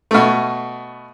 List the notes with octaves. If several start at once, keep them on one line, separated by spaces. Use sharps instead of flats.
B2 A3